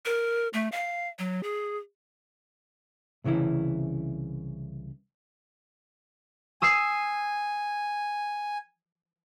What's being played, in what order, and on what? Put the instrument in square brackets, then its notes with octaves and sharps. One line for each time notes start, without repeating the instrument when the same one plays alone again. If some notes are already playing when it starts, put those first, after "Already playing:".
[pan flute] A#4
A3
F5
F#3
G#4
[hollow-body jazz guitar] C2 C#3 E3 C#4 E4
[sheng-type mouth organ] G#5 [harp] D#6 E6 C7